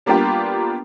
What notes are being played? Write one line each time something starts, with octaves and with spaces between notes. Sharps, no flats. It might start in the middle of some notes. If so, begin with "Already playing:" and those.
G3 A#3 B3 D4 F4 G4